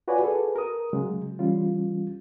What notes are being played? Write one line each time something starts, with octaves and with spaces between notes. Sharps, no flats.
F4 F#4 B4 C#5 D5 G#5
F#4 G#4 A4 B4
A#4 D#6
C#3 F#3 G#3
E3 G3 C#4 F4